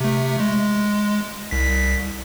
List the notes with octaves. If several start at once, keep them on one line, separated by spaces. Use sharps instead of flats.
C3 A3
G#3
C2 B6